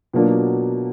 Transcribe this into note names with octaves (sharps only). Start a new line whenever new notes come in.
B2 F#3 A#3 D4 F4